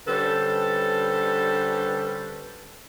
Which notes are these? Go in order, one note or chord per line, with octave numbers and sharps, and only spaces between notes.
D3 G3 C#4 A4 B4 C5